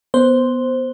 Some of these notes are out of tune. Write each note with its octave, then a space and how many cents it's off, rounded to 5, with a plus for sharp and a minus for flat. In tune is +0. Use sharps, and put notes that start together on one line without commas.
B3 +0 C5 +0